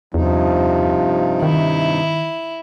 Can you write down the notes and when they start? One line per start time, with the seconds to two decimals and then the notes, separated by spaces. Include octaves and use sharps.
0.14 E2 G2 C3 F3 D#4
1.43 D#3 E4